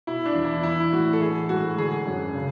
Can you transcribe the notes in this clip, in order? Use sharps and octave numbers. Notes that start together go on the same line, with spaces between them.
B2 E4
D4
E2
E4
E3 E4
A2 F#4
A4
E3 G#4
G#2 F#4
D3 G#4
F#2
C#3